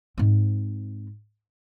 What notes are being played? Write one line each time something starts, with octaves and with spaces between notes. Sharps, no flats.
G#2 C4